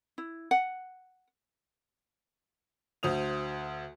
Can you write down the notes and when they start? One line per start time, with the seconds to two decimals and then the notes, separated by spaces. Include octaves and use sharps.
0.18 E4
0.51 F#5
3.03 D2 C5 D#6 F7